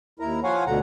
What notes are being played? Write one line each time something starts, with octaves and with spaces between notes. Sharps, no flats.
D#2 E4 A#4 A#5
F3 F4 C#5 F5 F#5 G#5
D2 B2 D3 F#5 A#5